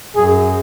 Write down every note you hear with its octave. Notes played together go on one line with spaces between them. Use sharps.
F#2 G#4